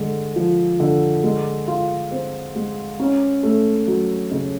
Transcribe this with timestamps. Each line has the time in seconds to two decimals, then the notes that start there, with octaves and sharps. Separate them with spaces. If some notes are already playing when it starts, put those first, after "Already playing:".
Already playing: D3 G#3
0.36 F3
0.80 D3
1.23 G#3
1.68 F4
2.11 C4
2.55 G#3
3.00 C#4
3.43 A3
3.88 F#3
4.31 C#3